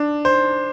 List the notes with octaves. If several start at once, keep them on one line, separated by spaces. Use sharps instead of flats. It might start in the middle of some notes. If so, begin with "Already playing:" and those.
Already playing: D4
C5